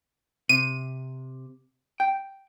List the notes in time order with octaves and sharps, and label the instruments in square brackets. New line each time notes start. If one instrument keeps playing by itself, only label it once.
[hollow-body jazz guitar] C3 [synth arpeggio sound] D#7
[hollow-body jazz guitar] G5